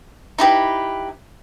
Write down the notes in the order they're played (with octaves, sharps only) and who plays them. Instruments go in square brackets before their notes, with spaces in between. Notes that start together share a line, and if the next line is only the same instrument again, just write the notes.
[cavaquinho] D#4 E4 G4 B4